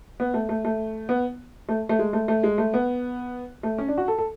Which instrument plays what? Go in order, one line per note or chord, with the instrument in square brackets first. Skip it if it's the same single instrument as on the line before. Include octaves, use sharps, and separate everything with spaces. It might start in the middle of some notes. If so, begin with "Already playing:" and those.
[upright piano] B3
A3
A3
A3
B3
A3
A3
G#3
A3
A3
G#3
A3
B3
A3
C#4
D4
F#4
A4
A4